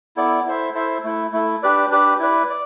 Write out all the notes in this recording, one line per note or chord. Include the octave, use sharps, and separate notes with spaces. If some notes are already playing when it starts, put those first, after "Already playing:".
B3 E4 A4 D5
E4 A4 C5 E5
E4 A4 C5 E5
A3 E4 A4
A3 E4 A4
D4 G4 B4 D5
D4 G4 B4 D5
E4 B4 D5
D5